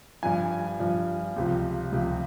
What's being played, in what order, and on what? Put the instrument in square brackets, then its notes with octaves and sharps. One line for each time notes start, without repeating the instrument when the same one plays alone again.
[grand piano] G2 F3 G#5
G2 F3
C#2 C3 F3
C#2 C3 F3